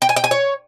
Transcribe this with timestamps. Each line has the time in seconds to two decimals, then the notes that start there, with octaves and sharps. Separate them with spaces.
0.02 G5
0.09 G#5
0.16 G5
0.24 G#5
0.31 C#5